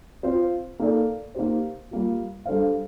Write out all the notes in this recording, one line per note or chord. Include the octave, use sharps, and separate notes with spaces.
C4 F4 C5
A#3 D#4 A4 D5
A#3 D#4 G4 C5
G3 A#3 F4
G3 D4 A4 C5 F5